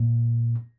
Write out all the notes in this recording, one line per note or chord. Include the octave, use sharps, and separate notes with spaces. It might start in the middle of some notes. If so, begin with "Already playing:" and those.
Already playing: A#2